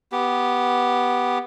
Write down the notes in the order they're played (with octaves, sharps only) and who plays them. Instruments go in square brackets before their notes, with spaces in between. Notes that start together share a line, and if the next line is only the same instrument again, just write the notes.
[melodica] B3 G4